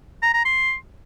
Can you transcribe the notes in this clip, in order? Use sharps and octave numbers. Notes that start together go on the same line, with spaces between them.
A#5
A#5
C6